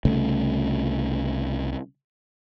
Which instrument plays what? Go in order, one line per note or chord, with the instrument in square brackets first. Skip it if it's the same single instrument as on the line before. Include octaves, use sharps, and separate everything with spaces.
[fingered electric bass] C2 C#3 A3